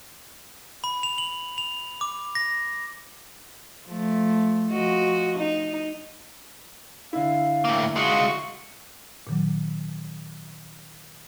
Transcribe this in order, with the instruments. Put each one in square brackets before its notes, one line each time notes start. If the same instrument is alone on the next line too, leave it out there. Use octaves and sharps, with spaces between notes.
[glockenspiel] B5
F7
F#7
F7
D6
A#6
[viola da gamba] F3 A3
F3 F#4 D#5
D#4
[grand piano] D3 E4 [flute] F5
[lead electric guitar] A2 A#3
[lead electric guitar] G#3 F4 [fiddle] F#4 C#6 [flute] F5
[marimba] A#2 D#3 F#3